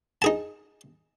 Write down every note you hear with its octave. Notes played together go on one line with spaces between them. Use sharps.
D#4 G#4 A5